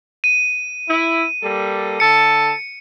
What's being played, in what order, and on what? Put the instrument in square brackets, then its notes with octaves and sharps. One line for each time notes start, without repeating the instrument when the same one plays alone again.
[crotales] D#7
[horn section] E4
G3 A#3 A4
[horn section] D3 A4 A5 [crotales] C#7